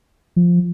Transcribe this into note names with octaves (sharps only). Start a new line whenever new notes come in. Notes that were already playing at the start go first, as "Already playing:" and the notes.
F3